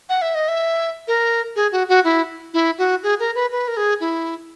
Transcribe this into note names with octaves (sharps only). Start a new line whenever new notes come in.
F#5
E5
D#5
E5
A#4
G#4
F#4
F#4
E4
E4
F#4
G#4
A#4
B4
B4
A#4
G#4
E4